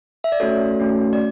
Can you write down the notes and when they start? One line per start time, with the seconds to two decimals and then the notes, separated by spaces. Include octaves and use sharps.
0.24 E5
0.32 D5
0.40 A3 C#4 F#4 A4 C#5
0.79 A3 C#4 F#4 A4
1.13 D5